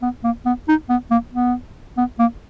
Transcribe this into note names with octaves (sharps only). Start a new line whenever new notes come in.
B3
A#3
B3
D#4
B3
A#3
B3
B3
A#3